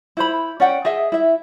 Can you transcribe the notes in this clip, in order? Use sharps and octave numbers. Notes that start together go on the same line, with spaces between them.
E4 C5 B5
C#4 D5 F#5 G5
G#4 D#5 E5
E4 E5